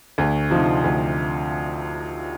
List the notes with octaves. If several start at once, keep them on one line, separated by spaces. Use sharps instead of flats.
D2
C3 F3 C4 D#4
D2